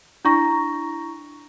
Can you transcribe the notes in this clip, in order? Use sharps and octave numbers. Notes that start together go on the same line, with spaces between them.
D4 E4 A#5 C#6 A#6